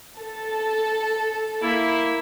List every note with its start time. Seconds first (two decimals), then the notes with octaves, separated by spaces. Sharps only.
0.20 A4
1.62 A#3 E4